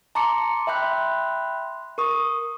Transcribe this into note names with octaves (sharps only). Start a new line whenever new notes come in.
A5 A#5 C6 D6 C#7
E5 G5 B5 C6 F#6
A#4 C#6 D#6